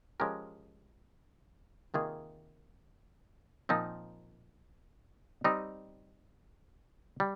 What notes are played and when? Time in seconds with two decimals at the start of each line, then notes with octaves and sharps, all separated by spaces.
0.20 F3 G#3 C#4 G4 A#4
1.94 C3 D#3 A#3 F4 G#4
3.69 A#2 F3 C4 D#4 A#4
5.44 G3 C4 D#4
7.20 G3